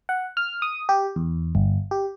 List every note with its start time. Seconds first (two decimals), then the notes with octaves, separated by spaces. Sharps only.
0.09 F#5
0.37 F6
0.62 D#6
0.89 G4
1.16 E2
1.55 G1
1.91 G4